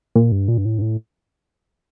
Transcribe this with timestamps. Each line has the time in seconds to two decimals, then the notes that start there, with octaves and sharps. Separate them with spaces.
0.16 A#2
0.32 G2
0.48 A#2
0.58 G2
0.65 A2
0.78 G2
0.81 A2